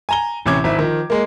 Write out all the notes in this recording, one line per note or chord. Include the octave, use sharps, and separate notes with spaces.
G#5 A#5 G7
A1 C3 C#4 D6 G#6
G#1 E4
D#3 F3
G#3 A#3